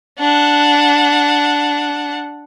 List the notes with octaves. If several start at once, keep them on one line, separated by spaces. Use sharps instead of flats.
D4 F#5